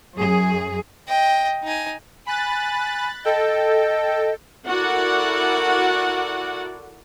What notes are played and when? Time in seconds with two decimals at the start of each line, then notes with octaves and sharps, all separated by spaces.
0.17 F#2 G#4
1.08 D#5 G5
1.64 D#4 G#5
2.27 G#5 B5 F#6 A6
3.25 A4 D#5 G5
4.67 E4 F#4 A4 A#4 D5 F#5